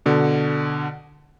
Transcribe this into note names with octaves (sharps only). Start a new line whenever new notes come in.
B2 D3